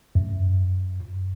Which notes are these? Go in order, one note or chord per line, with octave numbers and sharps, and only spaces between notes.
F#2